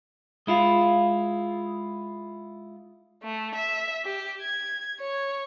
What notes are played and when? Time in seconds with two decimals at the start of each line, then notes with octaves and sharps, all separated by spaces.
0.47 G#3 E4 F4
3.23 A3
3.55 E5
4.05 G4
4.41 G#6
5.00 C#5